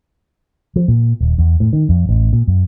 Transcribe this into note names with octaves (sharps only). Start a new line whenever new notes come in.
F3
A#2
D#1
E2
A2
D#3
F2
A1
A#2
F#2